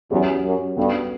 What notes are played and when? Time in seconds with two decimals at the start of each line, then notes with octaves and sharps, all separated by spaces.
0.10 E2 F#3 C#4 G4 C#5
0.44 F#2
0.77 G2 B3 F#4 A4